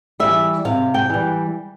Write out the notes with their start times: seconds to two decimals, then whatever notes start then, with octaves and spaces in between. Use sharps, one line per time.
0.20 E3 G3 E5
0.65 C3 F5
0.94 G5
1.10 E3 G3